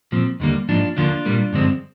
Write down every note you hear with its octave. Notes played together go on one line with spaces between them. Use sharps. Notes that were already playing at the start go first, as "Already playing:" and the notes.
A#2 F3 C4
D#2 D3 G3 A#3
G#2 F3 A#3 D4 F4
D2 D3 F3 A#3 D4 F4
A#2 G3 A#3
G2 D3 F3 G#3 C4